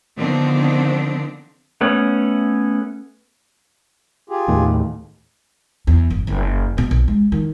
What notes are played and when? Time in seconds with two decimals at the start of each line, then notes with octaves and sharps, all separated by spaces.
0.16 D3 D#3 F3 B3 C4 D4
1.81 A3 B3 C#4
4.30 F4 G4 G#4
4.48 D#2 A2
5.87 E2
6.10 G1
6.27 F#1
6.78 B2
6.91 B1
7.08 G#3
7.32 D#3